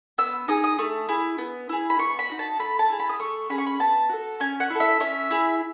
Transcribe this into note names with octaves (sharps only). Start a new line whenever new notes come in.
B3 E6
D#4 G#4 D#6
D#6
A3
E4 G#4
B3
E4 G#4
B5
B3 C#6
B5
D#4 F#4
A5
A3 B5
A5
E4 G#4
B5
D#6
A3 C#6
C#4 G#4 B5
C#6
B5
B3 A5
F#4 A4
C#4 G#5
F#5
E4 A4
E5
C#4 E5
E4 G#4